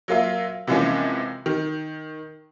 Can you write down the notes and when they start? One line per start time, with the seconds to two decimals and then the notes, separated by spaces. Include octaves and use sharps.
0.08 F#3 A#3 F4 E5
0.67 C3 E3 F3 G#3 A#3 C#4
1.46 D#3